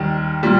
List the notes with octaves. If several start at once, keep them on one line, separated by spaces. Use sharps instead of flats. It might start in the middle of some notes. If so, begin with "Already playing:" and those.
Already playing: D#2 D#3 G3
A#2 G3